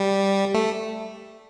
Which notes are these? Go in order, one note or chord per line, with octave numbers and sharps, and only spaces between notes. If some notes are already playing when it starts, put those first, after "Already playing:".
Already playing: G3
A3